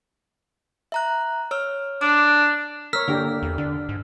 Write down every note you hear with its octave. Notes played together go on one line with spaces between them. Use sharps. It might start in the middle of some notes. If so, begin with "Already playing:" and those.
E5 A#5 F#6
C#5 E6 F6
D4 D6
A#4 C#5 E6 F6 B6
D3 A#3 D4 G4
E2
D3 D4
G#2